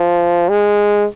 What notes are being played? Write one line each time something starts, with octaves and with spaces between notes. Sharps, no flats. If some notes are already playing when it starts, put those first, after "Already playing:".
Already playing: F3
G#3